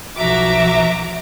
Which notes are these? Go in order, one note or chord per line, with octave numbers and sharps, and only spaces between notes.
B1 F3 F#4 E5 A#5 D6